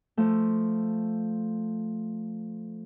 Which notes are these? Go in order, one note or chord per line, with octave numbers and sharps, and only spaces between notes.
F3 A3